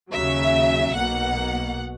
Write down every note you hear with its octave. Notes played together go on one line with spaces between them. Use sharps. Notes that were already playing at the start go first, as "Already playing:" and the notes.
D#2 C#3 F#3 E5
B1 B2 A#3 F#5